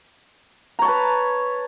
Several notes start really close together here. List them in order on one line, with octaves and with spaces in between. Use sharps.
A#5 C#5 A5 B4